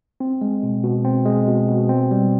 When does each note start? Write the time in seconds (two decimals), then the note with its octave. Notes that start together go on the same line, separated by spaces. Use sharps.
0.20 C4
0.41 G#3
0.63 B2
0.83 B2
1.05 C4
1.25 G#3
1.48 B2
1.68 B2
1.89 C4
2.11 G3